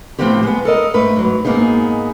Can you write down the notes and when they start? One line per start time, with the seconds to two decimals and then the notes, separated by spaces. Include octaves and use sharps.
0.19 A2 F3 G3 B3 C4 G4
0.43 G#3 B3
0.65 A4 A#4 D#5
0.94 G#2 A3 B4
1.16 G#2 F#3
1.45 G#2 C3 A#3 B3 D#4 G#4